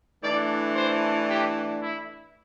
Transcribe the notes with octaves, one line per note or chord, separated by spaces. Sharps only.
E3 A3 D4 D5
C5
G4
E4